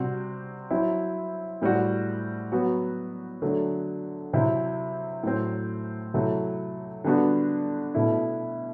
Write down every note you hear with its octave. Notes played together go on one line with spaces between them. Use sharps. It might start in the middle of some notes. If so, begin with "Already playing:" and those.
Already playing: C3 G3 C4 F#4
F#3 C4 E4
A2 G3 C4 F#4
F#3 B3 F#4
D3 F#3 A3
C3 F#3 C4 E4
A2 F#3 C4
C3 F#3 A3 E4
D3 G3 B3 D4 F#4
B2 A3 E4